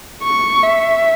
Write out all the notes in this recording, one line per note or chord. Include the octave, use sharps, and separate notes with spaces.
C#6
E5